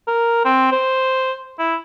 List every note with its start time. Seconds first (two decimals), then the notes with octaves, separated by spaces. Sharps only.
0.08 A#4
0.45 C4
0.72 C5
1.59 E4